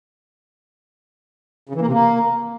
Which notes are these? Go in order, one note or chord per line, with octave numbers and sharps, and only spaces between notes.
C#3
E3
A#3
C3
A#3